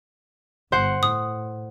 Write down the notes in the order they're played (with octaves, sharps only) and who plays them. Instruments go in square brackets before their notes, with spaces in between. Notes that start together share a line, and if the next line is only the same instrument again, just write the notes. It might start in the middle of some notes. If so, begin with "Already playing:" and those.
[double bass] G1 [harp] C5 F#5
[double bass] A2 [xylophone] D#6